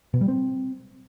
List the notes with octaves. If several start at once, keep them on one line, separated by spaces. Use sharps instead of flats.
B2
G3
C4